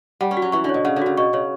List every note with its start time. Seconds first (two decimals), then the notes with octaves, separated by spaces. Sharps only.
0.21 G3 F#5
0.31 C#4
0.37 F#4
0.42 F#3
0.52 E3 C#6
0.64 D3
0.69 B2 C#5
0.85 C#3 F#5
0.96 D3
1.02 C#3 F#4
1.17 B2 C#6
1.33 C#3 C#5